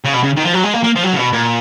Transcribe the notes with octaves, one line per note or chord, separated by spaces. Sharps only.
C#3
B2
C#3
D#3
F3
F#3
G#3
A#3
A#3
F3
F#3
C#3
B2
A#2